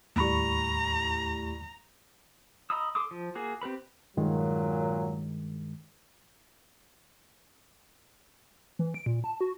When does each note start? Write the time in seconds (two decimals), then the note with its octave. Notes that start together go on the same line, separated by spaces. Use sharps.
0.16 D#2 A2 G3 A#5 B5 C#6
2.70 D#5 A#5 B5 D#6 E6
2.95 A4 C6 D6 D#6
3.11 F3
3.35 A#3 F#4 G#4
3.62 C4 G4 B4 B5
4.17 G2 A#2 D#3 F#3 G#3
8.79 E3
8.94 D7
9.06 A#2
9.24 A5
9.41 F#4